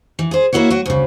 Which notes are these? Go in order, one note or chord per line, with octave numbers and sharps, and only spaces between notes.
E3
G#4 C5
A#3 C4 E4 F#4 C#5
F#3 F#4
D2 C#3